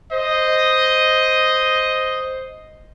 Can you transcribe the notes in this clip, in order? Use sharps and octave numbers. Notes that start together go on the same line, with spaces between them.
C5 D#5